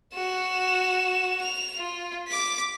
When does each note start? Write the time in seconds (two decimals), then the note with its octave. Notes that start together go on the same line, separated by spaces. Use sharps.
0.14 F#4 E7
1.42 F7
1.78 F4
2.28 D6 B6